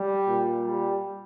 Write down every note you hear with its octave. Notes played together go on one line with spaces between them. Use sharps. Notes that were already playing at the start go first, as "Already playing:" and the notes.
Already playing: G3
A#2
G3